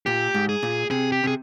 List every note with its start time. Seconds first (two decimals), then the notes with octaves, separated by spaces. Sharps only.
0.06 A#2 G4
0.34 G#2
0.49 G#4
0.63 A#2
0.91 C3 G#4
1.12 G4
1.24 C3 G#4